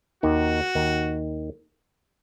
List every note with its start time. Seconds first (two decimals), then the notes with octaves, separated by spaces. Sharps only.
0.23 D#2 D#3 F#4
0.75 D#2 D#3